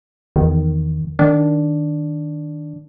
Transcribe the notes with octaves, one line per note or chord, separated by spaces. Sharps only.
E2 D#3
D#3 D4